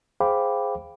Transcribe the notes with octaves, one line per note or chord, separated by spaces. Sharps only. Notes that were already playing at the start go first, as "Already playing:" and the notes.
G#4 C5 F5 G5 B5 D6